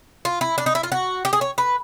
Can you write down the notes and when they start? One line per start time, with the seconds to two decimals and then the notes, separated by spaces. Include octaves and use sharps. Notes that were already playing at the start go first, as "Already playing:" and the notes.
0.25 F4
0.41 E4
0.58 D4
0.66 D#4
0.75 E4
0.83 F4
0.92 F#4
1.25 G4
1.33 G#4
1.41 C#5
1.58 B4